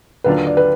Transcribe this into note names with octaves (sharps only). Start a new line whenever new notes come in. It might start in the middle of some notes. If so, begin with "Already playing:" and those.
D#2 D3 F#3 D4 F4 B4
D5
B4